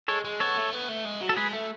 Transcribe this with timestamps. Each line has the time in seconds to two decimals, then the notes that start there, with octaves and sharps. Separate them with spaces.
0.08 G#3 A4 C#5
0.24 G#3
0.40 B3 A4 C#5
0.57 A3
0.73 B3
0.89 A3
1.05 G#3
1.21 F#3
1.29 A4
1.36 G#3 G#4 B4
1.53 A3